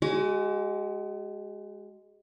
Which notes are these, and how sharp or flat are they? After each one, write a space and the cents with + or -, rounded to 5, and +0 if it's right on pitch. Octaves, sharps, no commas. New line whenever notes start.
G#3 +0 F#4 +40